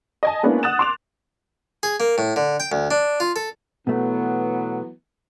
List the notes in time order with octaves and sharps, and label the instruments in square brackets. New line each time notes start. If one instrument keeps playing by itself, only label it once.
[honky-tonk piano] D#5 G#5 A5
G#3 A#3 B3 C#4 D4 E4
F#5 D#6 F#6 A6 E7
C6 D6 F7
[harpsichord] G#4
A#3
A2
D3
G5
D2
D4
F4
A4
[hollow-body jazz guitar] B2 A3 [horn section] E3 F#3 B3